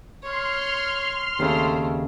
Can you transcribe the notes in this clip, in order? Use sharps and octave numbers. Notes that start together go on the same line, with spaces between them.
C#5 C6 F6
D#2 C#3 A3 C4